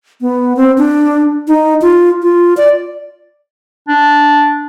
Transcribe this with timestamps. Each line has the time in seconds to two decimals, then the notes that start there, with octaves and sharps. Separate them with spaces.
0.21 B3
0.57 C4
0.78 D4
1.48 D#4
1.82 F4
2.22 F4
2.57 D5
3.88 D4